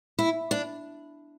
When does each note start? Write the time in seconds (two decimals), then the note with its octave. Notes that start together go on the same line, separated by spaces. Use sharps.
0.19 E4
0.51 D4